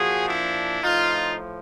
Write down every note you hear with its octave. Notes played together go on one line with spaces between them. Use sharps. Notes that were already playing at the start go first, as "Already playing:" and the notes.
Already playing: A#2 F3 F#4 G#4
D4 E4
A2 F3 D#4 F4